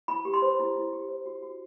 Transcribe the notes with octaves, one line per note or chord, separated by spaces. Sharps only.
E4 B5
G4
C6
C5
E4
E4
G4
C5
F#4
F#4